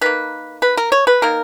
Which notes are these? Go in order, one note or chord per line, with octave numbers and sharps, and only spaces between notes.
D#3 A#3 B4
B4
A#4
C#5
B4
D#3 A#3 A#4